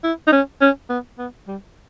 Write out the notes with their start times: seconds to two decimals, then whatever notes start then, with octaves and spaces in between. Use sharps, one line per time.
0.04 E4
0.27 D#4
0.32 C#4
0.61 C#4
0.90 B3
1.18 B3
1.48 G3